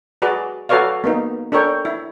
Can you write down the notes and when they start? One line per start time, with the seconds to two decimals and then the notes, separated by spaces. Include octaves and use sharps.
0.22 F#4 G#4 B4 D5
0.69 F#4 A4 B4 C#5 D5 F5
1.04 A#3 B3 D#4
1.52 D4 A4 A#4 C#5 G5
1.85 E4